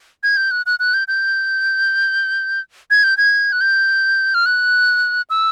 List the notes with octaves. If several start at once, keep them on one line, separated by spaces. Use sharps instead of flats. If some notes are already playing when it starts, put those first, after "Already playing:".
G#6
G6
F#6
F#6
F#6
G6
G6
G#6
G6
G#6
F#6
G6
F6
F#6
E6